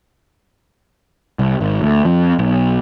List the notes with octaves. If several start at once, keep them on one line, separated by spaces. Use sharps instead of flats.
C2
G#1
D2
F2
B1